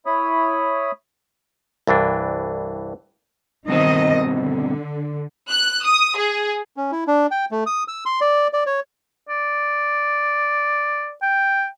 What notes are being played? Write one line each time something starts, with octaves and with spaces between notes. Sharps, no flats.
E4 C#5 B5 D#6
C2 G2 E3 D4
G2 B2 D#3 C4 D#5
D3
F#6
D#6
G#4
C#4
E4
D4
G5
A3
D#6
E6
C6
D5
D5
C#5
D5
G5